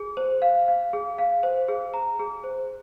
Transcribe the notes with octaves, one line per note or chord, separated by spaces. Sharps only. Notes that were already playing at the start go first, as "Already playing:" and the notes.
Already playing: G#4
C5
F5
F5
G#4
F5
C5
G#4
A#5
G#4
C5